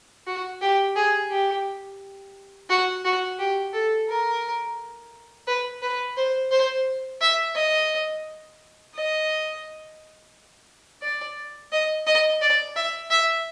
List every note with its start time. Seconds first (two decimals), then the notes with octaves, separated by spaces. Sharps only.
0.27 F#4
0.61 G4
0.96 G#4
1.31 G4
2.70 F#4
3.05 F#4
3.39 G4
3.73 A4
4.08 A#4
5.47 B4
5.82 B4
6.17 C5
6.51 C5
7.21 E5
7.55 D#5
8.95 D#5
11.02 D5
11.72 D#5
12.07 D#5
12.42 D5
12.76 E5
13.10 E5